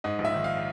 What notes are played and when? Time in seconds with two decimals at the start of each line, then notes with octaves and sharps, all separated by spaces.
0.04 G#2 D#5
0.19 A#1
0.25 E5
0.34 D#3
0.44 F5